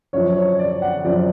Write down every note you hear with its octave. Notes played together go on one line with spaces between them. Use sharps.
F#2 F3 C#5
C#5
D5
F#5
F#2 F3 D5